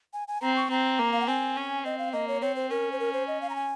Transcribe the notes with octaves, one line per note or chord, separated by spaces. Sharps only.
G#5
G#5
C4 A#5
C#6
C4 A#5
A#3
F5
F#5
C4 G#5
C#4
C4 D#5
F5
A#3 D#5
C#5
C4 C#5
C5
C#4 A#4
C5
A#4
C5
D#5
F5
A#5
G#5